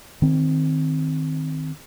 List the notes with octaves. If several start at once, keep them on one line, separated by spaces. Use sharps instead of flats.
D#3 C4